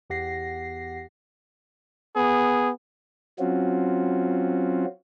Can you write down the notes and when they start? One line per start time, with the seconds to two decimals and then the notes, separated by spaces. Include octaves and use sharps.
0.10 E2 G4 F#5 A#6 C7
2.16 B3 G#4
3.39 F#3 C4 C#4 F4 F#4